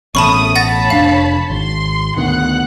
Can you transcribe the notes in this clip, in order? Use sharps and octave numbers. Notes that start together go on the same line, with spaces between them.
A1 B2 A3 C#4 A5 B5 C#6 D#6
C#5 F#5 A5 B5 A6 A#6
F1 D4 F5
G#1 C6
D2 B2 D#3 F#5 F#6